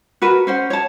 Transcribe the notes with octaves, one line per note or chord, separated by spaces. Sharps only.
F#4 A#4 B4
C#4 C5 F#5
C#5 A5